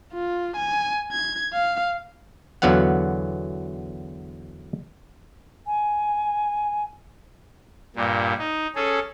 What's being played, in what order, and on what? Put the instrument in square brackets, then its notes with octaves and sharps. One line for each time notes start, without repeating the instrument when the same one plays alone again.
[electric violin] F4
G#5
G#6
F5
[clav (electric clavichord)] E2 D3 F#3 B3 F5 F#5
[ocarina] G#5
[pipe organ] G2 A#2
D#4
C#4 G#4 A4